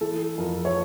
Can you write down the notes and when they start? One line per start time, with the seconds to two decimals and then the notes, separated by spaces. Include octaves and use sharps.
0.01 E3 A4
0.38 F2 A#4
0.65 C#5